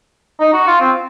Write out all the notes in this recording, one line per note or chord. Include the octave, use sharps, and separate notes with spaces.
D#4
F#4
F4
C4